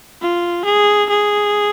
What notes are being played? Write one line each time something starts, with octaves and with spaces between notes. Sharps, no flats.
F4
G#4
G#4